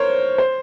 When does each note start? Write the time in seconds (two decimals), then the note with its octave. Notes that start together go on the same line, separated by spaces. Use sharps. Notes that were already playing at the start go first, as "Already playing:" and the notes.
Already playing: A#4 C5 C#5
0.38 C5